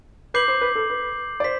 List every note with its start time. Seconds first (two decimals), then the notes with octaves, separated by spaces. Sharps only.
0.34 B4 D6 G6 C7 F#7
0.48 C5
0.61 B4
0.75 A4
0.90 B4
1.40 D5
1.44 C5 B6